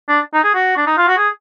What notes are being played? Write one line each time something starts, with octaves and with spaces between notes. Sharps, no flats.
D4
D#4
G#4
F#4
D4
D#4
F4
F#4
G#4